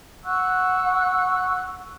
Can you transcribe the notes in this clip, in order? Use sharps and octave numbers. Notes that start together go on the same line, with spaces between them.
F#5 C#6 E6 F#6